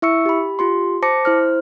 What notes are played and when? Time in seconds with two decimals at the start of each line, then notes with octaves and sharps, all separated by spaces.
0.02 E4 E5 C#6 E6 C#7
0.26 G4 B5
0.59 F4 G4 C6
1.02 C5 A5 D6 A#6 C#7
1.25 E4 C5 F6